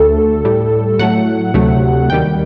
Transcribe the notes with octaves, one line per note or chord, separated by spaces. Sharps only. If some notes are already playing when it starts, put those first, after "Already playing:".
Already playing: D2 D3 A3 A4
A2 G3
A2 F#3 A3 F#5
D2 C3 F#3 A3
D#2 D#3 G3 G5